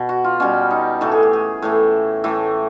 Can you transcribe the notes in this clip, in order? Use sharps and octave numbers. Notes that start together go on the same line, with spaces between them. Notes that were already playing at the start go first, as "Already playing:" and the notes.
Already playing: B2 B4
F#4
F4
B2 G3 C#4
D#4
A2 E3 A3 A4
G#4
G4
G#4
A2 E3 A3
A2 E3 A3